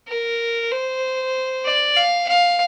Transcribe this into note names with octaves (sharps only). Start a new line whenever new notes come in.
A#4
C5
D5
F5
F5